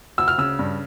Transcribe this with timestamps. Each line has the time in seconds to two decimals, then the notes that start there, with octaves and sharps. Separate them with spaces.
0.18 D2 E6
0.28 F6
0.38 C#3 E6
0.59 G2